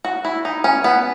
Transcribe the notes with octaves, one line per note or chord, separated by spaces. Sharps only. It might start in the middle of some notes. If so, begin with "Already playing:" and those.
F#4
E4
D#4
C#4
B3